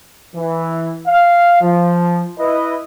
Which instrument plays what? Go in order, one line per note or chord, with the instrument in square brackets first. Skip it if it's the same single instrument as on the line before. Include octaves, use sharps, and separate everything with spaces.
[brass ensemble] E3
F5
F3
E4 B4 D#5